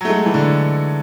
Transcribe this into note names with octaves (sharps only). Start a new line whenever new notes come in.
F#3
A3
G#3
E3
D3